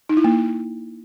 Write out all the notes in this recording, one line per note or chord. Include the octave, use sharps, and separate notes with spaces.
D#4
E4
A#3